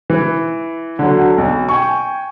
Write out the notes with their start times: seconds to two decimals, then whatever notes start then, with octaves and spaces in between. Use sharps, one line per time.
0.10 E3
0.99 D3 F#3
1.38 B1
1.69 G5 G#5 C#6